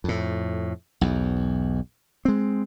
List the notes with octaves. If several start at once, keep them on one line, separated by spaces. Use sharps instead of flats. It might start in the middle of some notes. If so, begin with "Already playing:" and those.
F2 A2
B1 E2
G#3 C4